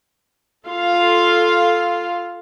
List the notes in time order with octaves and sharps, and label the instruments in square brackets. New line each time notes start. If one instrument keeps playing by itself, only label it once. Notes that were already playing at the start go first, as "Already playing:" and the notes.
[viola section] F4 A4 F5